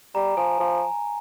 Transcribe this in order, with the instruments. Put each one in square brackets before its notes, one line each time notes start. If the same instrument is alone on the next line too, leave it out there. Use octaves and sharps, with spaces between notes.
[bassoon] G3 [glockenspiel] A#5
[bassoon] F3 [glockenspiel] G#5
[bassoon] F3